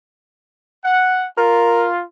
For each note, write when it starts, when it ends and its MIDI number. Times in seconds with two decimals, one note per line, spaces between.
0.84 1.26 78
1.37 2.03 65
1.37 1.87 70